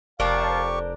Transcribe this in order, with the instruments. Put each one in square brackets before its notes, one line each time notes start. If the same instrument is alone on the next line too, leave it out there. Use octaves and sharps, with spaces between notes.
[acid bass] F1 [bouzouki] D4 A#4 C5 [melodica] G4 C#6 [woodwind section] F5 A5